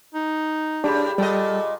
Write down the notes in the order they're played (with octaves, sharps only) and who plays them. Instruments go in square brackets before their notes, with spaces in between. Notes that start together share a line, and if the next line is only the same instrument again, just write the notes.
[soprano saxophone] D#4
[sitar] A2 G3 [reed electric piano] D4 [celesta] G4 G#4 B5
[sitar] A#2 D#5 [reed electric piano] G3 G5 [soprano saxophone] A4